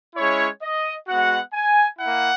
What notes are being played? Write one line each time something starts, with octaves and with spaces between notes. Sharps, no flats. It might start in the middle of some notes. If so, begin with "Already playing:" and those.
G#3 C#4 E4 C#5
D#5
G#3 B3 F#4 F#5
G#5
A#3 E4 F#5